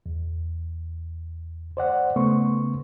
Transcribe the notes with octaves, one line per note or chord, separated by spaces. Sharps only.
E2
C5 D5 F#5
C#3 A3 B3 C6 C#6